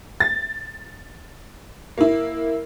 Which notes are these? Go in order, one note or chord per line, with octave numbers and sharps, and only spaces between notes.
A6
A#3 E4